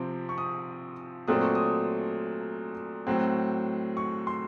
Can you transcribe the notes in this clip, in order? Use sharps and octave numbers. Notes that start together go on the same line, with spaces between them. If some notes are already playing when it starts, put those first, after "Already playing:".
Already playing: C3 F3 C4
C#6
D#6
A#2 F#3 A3 C4 D#6
C#6
D#6
A2 F#3 C4
C#6
C6